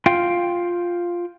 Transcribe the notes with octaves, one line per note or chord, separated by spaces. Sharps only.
F4 F5 G5